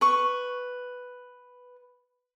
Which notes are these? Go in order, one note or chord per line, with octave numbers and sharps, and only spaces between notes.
B4 C#6